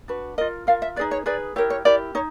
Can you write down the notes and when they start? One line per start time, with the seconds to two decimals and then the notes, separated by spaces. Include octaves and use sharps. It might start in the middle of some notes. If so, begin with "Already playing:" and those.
0.08 D4 F#4 B4
0.38 F4 A#4 D#5
0.67 F4 A#4 F5
0.82 E5
0.96 D#4 G#4 B4 D5
1.11 C#5
1.26 D#4 G#4 B4 D5
1.56 E4 G4 A#4 C#5
1.70 C#5
1.85 E4 G4 A#4 D5
2.15 D#4 C#5